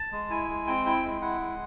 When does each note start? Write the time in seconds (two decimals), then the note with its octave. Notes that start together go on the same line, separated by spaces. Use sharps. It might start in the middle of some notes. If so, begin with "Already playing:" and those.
Already playing: A5
0.12 G#3
0.30 E4 G#5
0.49 G#3
0.67 C4 G5
0.86 E4 G5
1.04 G#3
1.21 E4 F#5
1.41 G#3